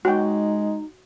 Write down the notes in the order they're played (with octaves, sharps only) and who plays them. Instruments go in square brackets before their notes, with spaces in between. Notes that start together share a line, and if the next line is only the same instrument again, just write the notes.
[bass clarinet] G#3 [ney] D#4 [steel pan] F#4 G5